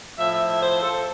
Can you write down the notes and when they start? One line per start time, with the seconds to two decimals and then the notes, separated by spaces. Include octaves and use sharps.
0.18 A2 F3 E5
0.33 E5
0.47 E5
0.61 C5
0.82 A4